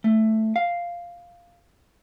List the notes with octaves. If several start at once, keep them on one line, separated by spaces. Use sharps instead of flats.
A3
F5